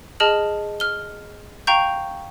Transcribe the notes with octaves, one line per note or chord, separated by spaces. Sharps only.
G#4 D#5 A5 F6 F#7
F6 G7
F5 G5 A#5 C#6 G6